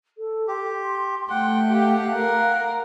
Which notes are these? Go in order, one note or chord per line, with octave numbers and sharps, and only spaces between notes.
A4
G4 C6
A3 F#5 G5
G4 F5
A#4